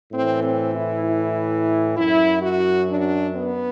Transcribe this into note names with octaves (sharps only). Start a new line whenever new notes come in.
A2 E3 C4
C4
E4
E4
F#2 F#3 E4
F#4
D4
B3